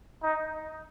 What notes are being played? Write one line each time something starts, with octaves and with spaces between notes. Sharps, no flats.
D#4